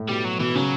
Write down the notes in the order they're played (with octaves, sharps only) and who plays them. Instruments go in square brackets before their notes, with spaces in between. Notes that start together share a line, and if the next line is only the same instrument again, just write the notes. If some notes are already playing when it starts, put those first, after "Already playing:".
Already playing: [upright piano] A2
[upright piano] B2 [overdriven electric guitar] G3
[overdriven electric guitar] F#3
[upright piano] B2 [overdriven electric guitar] E3
[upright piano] C#3 [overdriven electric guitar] F#3